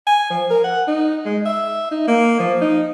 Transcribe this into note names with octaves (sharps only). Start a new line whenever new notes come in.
G#5
F3
A#4
F#5
D#4
G#3
E5
D#4
A#3
F3
D#4